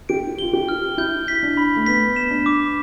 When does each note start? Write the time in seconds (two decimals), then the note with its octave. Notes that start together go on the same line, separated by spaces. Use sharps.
0.09 G4 D7
0.39 F4 G7
0.53 G4
0.69 F6
0.98 E4 G6
1.28 B6
1.43 D4
1.57 B5
1.76 A3
1.86 B3 B6
2.16 E7
2.30 D4
2.46 D6